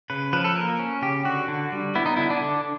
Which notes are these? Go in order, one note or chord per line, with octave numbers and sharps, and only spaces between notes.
C#3 B4
F3 B4
A4
A#3 A#4
C#4
C#3 G4
D3 F#4
D3
G3
B3 E4
D#4
D3 E4
D4
D3